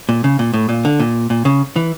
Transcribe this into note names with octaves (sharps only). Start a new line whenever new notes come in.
A#2
C#3
A#2
A2
A#2
D3
A#2
A#2
C#3
E3